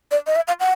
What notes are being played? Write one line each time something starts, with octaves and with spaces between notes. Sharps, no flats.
D5
D#5
E5
F5
F#5